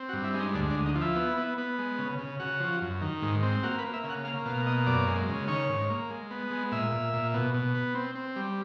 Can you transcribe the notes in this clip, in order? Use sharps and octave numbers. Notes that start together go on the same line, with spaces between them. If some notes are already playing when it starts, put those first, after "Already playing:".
Already playing: C4
F#4
G2
E4
G#3
D#4
D2 D4
D4
D2
D#4
F3
E4
B3
B3
B3
G#3
C#3
C#3
C#3 F#4
F3
F#2
D#3
G#2
C4
A#3 F#4
B4
A#3
E5
C#3
F#5
A#3 F5
B2 F5
A#3 D#5
F#2 D5
G#3
C#3
D#3 C#5
G#2
A#3
G#3
B3
G#3
A#2 E5
A#2
A#2
B2
B2
B3
C4
C4
G3